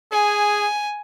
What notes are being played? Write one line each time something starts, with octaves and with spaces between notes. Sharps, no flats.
G#4 G#5